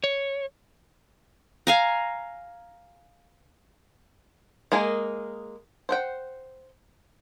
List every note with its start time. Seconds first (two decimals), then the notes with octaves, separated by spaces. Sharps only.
0.04 C#5
1.67 F5 G#5 A#5
4.72 G#3 A#3 G#4 A#4
5.89 C5 F#5 G5